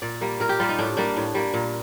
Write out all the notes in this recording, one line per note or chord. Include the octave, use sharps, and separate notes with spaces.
A#2 D5
G3 A#3
A#2 A#4
G4
G3 A#3 F4
D#4
A2 D4
G3 A#3 D4
A2
G3 A#3
A#2